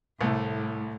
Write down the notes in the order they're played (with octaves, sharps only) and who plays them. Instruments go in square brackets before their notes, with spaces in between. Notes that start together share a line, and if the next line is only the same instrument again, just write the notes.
[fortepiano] C2 A3 [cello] A2